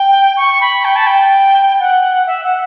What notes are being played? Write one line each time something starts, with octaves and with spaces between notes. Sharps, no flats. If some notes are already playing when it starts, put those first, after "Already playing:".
Already playing: G5
C#6
B5
G5
A5
G5
F#5
E5
F#5